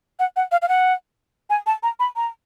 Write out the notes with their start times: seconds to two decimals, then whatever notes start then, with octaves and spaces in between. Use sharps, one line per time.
0.19 F#5
0.36 F#5
0.52 F5
0.62 F5
0.69 F#5
1.50 G#5
1.67 A5
1.83 A#5
2.00 B5
2.16 A#5